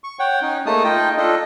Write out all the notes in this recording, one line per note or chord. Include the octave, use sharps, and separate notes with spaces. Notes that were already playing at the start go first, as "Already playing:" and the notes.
C#6
C#5 F#5 G5
C#4 D#4
A3 A#3 D#4 G#4 A5 D#6
D#4 F4 D#5 G5
D4 F4 A4 D#5